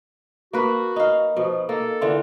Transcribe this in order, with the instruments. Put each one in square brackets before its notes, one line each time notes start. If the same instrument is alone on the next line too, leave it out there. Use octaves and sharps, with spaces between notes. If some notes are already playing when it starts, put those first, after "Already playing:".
[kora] A#3 B4 [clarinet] F#4
[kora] D#4 F5
[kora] B2 [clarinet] F3
[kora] A#3 [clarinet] A4
[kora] D3 E3 F4